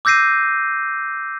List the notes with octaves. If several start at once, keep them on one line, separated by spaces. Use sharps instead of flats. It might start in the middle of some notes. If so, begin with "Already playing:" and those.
D6 E6 G6 A#6 C7 D#7